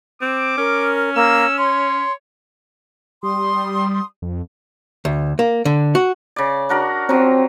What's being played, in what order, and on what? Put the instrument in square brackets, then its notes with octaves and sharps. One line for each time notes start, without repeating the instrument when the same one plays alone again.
[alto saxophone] C4 [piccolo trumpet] D6
[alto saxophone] C#4 [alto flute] A#4
[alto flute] A#3 [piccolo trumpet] E6
[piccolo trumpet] C#5 [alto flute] C6
[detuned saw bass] G3 [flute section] C6 D#6
[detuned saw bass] F2
[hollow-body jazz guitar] D2
A#3
D3
F#4
[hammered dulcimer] C#3 D5
D4 F#4 A#4
[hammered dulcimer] F3 F#3 [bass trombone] C4